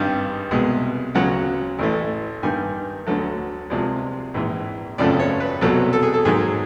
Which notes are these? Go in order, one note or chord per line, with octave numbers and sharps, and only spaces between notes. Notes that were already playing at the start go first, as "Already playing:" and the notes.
Already playing: G#1 G2 D#3 G3 F5
C2 B2 G#3
D2 C#3 F#3 F#5
A1 A2 E3 A3
G2 D#3 G3 A#3 G#5
D2 D3 F#3 A3
C2 C3 F3 G#3 D5
A#1 G#2 E3
G#1 F#2 C#3 F3 A3 D5
C#5
B4
C2 B2 F#3 A4
A4
G#4
A4
G#2 D#3 F#3 A#3 G#4